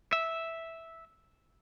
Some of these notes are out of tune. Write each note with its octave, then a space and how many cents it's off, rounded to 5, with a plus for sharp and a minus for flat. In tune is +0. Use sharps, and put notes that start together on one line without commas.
E5 -5